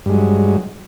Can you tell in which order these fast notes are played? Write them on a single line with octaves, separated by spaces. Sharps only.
G2 G#3 F#3